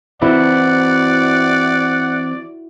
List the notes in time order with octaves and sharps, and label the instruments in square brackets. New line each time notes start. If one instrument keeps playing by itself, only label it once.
[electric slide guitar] E3 C4 [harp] E4 F#4 B4 [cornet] D5 [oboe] F#5